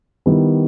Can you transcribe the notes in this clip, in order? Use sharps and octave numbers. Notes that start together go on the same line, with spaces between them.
D#3 G3 B3 E4 G4